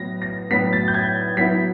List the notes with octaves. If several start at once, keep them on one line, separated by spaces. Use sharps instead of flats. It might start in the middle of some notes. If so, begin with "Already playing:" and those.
Already playing: A2 F#3 B3 A#6
A#6
A2 F#3 B3 B6
A6
G6
G#6
F#3 B3 E4 B6